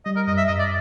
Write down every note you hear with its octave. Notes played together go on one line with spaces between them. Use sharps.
G3 D#5
A#4
F#2 D#5
E5
F#2 D#5
D5